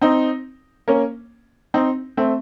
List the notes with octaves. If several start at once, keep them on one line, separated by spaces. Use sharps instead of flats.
C4 D#4
A#3 C#4
C4 D#4
A3 C4